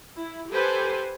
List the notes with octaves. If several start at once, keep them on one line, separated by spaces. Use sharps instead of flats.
E4
G4 A4 B4 C5 G#5